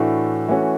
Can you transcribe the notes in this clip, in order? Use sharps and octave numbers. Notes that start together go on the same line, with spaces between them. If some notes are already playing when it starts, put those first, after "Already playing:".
Already playing: A2 E3 A3 D4 F#4
E3 A3 C#4 F#4